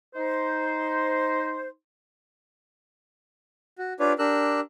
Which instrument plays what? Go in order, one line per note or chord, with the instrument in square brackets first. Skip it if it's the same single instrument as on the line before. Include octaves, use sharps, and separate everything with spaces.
[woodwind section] D#4 C5
[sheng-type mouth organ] F#4
D4 F4 G4 B4 C#5 D5
D4 G4 A#4 E6 F#6